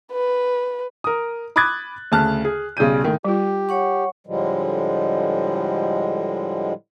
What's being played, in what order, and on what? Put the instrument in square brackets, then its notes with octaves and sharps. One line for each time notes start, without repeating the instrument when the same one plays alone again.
[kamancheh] B4
[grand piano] A#4 D#6
B5 D6 D#6 F#6 G#6 A6
D2 C#3 A5 F6 F#6
G#4
B1 C#3 G3 G6 D#7
A2 D#3
[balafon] G3 F4 [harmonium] G4
[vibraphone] C#5 F#5 C#6
[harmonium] A2 D3 F3 G3 G#3